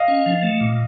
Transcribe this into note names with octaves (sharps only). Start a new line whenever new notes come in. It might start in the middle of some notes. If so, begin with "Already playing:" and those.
Already playing: D#5 F5
C#4
F3
A3
A#2